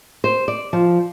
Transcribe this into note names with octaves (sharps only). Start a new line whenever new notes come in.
C5
D5
F3